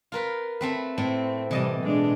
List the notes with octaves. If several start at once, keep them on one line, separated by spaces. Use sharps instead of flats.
F4 A#4 B4
A3 C4 B4
A2 A3 C4
C3 E3 G3 D#5 A5
B2 G#3 D4